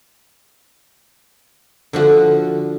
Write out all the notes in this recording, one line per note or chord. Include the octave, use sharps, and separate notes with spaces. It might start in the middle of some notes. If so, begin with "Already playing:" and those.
D3 F3 F#4